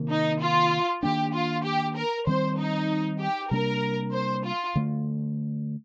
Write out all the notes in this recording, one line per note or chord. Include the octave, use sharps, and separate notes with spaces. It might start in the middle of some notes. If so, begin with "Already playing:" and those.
Already playing: C3 D#3 A#3
D#4
F4
D#3 A#3 D4 G4
F4
G4
A#4
D#3 G3 C4 C5
D#4
G4
C3 G3 A#3 D4 A#4
C5
F4
D3 A3